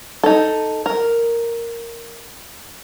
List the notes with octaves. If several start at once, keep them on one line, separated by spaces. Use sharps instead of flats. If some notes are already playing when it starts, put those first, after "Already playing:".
D#4 A4
A#4